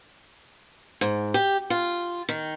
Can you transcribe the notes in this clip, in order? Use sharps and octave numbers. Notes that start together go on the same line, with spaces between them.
G#2
G4
F4
D#3